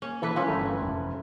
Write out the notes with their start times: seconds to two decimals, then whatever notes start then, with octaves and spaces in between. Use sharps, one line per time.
0.02 A#3 C#4
0.22 E3 E4 A4 B4
0.36 E3 A3 C#4 F4
0.48 G1 A3 A#4
0.82 F1